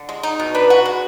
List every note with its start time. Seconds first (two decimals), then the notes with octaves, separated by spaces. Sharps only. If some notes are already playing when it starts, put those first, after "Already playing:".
Already playing: D3
0.09 G#3
0.23 D#4
0.40 B2
0.54 D4 B4
0.70 F#4
0.86 G#3